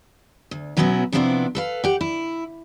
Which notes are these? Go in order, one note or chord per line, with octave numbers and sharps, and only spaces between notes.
D2
B2 F#3 B3 C#4 E4 F#4
C3 F3 B3 C4 D4 E4
A4 B4 F5
G4 F#5
E4